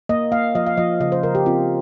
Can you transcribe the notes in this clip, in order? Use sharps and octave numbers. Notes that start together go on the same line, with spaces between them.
A#3 D#5
A#3 F5
F3 D#5
F5
F3 D#5
C#3 D#5
C5
C#3 A#4
G4
C4 F4